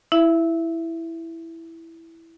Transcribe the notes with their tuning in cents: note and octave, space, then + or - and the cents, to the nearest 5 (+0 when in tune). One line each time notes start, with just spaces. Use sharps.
E4 +0 E5 +20